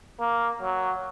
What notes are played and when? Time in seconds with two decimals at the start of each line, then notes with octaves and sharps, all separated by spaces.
0.20 A#3
0.62 F#3